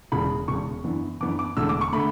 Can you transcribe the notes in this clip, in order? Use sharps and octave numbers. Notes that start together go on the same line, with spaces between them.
E1 E2 C#3 B5
E1 E2 C#3 C#6
F#2 E3 B3 D4
F#2 E3 B3 D4 D6
D6
E1 E2 D3 A3 E6
D6
C#6
D3 A3 B5